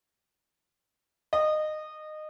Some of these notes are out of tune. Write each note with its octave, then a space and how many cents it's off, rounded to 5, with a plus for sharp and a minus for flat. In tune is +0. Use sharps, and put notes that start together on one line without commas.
D#5 -20